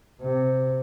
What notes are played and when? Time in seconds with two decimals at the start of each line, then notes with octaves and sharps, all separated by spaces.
0.22 C3